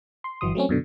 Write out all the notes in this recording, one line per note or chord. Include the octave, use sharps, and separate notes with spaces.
C6
G1 E3 F#3 C6 D#6
F#3 A3 C4 C#4
F#2 B2 D3